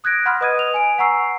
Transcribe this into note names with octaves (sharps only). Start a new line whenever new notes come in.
D#6 F#6 G#6 A#6 D7
F#5 B5 C6 F6
B4 D#5 D#6 G#6 D#7
B4 F7
G#5 D7
F#5 G#5 A#5 C#6 E6 C7